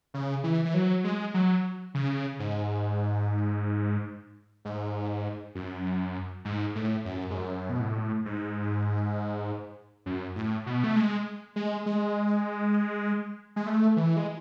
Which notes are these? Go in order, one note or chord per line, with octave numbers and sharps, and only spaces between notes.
C#3
E3
E3
F#3
G#3
F#3
C#3
G#2
G#2
F#2
G#2
A2
F#2
G#2
F#2
B2
A2
G#2
F#2
A2
B2
A3
G#3
G#3
G#3
G#3
A3
E3
G#3